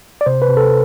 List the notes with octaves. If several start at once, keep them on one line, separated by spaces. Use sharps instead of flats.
D5
C3 C5
B4
C3
A4